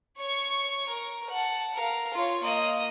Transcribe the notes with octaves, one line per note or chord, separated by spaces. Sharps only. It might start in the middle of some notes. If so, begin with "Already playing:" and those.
C#5 C#6
A#4
F#5 A5
A#4 F5
F4 C#5
A#3 D#5